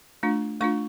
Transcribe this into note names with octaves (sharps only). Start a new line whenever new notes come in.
A3 D4 F4
A3 D4 F4 C#6